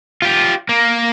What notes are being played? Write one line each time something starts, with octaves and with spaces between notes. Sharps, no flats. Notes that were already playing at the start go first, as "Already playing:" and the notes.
F4 G4
A#3